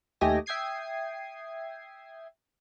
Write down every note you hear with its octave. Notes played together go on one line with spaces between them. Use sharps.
D#2 A3 G4 D#5 G#5 A#6
E5 G5 D#6 G#6 C7 D#7